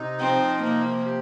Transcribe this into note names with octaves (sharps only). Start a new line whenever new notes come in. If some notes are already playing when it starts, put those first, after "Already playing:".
Already playing: C3 D#4
F3 C4
C3 A#3
G4